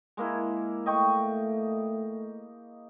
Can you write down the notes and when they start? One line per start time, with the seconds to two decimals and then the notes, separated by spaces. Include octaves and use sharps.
0.17 G#3 A#3 E4
0.86 A3 D#5 G5 C#6